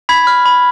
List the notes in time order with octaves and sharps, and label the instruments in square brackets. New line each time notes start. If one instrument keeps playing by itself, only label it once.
[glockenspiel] B5 G#6 B6
F6
B5